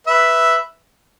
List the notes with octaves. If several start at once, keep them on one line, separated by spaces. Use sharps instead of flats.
B4 E5